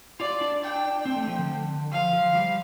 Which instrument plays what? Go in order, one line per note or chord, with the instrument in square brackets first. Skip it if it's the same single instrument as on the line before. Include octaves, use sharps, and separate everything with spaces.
[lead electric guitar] F4 [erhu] D5
[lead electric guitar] D4
[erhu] G5
[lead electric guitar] C4
A3
F3
D3
[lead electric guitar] F3 [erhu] F5
[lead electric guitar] F3
G3